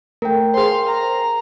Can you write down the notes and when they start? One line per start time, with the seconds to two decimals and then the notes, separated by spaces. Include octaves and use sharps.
0.22 A3 A#4 G5
0.54 G#4 C5 F5 C6
0.86 A#5